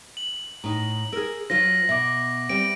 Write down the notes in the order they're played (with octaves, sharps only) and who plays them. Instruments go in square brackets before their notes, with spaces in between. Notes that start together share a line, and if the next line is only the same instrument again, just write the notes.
[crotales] F#7
[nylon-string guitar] A2 D#4 [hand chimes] A#5
[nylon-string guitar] G#4 A#4 [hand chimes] E6 F6
[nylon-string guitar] F#3 F4 C5 [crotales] A#6
[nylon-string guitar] B2 [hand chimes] E5 D6
[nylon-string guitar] G3 C4 [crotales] D7